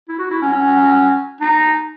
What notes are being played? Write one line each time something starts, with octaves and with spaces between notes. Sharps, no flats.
E4
F#4
E4
C#4
C#4
D#4